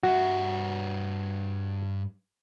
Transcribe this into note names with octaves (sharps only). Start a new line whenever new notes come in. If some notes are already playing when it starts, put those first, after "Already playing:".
G2 F#4 E5